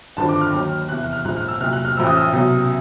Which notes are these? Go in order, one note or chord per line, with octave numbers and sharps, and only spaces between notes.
G#1 G2 D3 F3 A5
D6
F6
D#2 D#3 F#3
E2 C3 E3 F#6
F#6
F6
A#1 G#2 F3 F#6
F6
E6
C2 A#2 F#3 F6
F#6
F6
A1 A2 F3 E6
D#6
E6
C2 B2 F#3